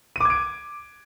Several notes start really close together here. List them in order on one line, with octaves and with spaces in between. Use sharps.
D#7 D6 G#6 D7